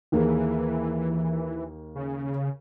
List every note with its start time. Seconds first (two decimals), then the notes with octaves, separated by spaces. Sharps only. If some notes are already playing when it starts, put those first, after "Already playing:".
0.12 D#2 E3 A#3 G#4
1.95 C#3